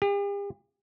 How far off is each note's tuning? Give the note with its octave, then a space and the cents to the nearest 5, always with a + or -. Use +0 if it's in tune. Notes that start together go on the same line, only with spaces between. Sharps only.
G4 +45